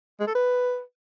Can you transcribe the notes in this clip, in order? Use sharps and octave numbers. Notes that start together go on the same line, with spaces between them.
G#3
A4
B4